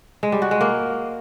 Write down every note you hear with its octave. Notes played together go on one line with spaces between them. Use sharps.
G#3
G3
F#4
G#3
A#3